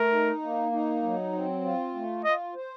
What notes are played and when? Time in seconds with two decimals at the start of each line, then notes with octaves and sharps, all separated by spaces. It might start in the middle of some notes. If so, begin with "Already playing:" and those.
Already playing: A3 A#4
0.12 D#4
0.42 A#3
0.72 D#4
1.03 F#3
1.33 C4
1.64 F4
1.95 A3
2.25 F4 D#5
2.55 C5